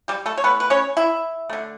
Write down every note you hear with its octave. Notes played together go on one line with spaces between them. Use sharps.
G3 G4
A3 A4
C#5
E3 A3 B3 B4
B4
C#4 C#5
E4 E5
D3 A3